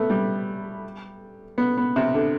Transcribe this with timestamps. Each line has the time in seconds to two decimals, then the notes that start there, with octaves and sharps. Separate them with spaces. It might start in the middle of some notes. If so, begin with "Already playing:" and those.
Already playing: A3 B3
0.10 G3
1.58 B3
1.77 B3
1.96 C3
2.14 D3